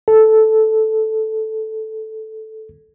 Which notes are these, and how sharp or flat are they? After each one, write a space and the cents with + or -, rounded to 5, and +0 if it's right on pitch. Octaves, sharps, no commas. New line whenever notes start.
A4 -5